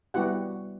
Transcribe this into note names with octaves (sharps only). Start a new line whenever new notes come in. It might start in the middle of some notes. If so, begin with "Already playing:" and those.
G3 B3 E4 F#4 G4 F#5